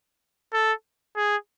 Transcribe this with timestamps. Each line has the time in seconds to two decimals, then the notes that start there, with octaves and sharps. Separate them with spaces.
0.53 A4
1.17 G#4